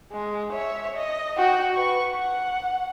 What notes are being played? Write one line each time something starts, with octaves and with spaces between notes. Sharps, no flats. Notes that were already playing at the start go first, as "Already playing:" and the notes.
G#3
C#5 E5
D#5
F#4 G5
B4 C#6
F#5